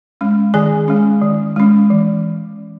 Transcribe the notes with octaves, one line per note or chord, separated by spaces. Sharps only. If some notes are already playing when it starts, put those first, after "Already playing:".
G#3 C#4
D#3 G#4 G#5
G#3 C#4
D#3
G#3 C#4
E3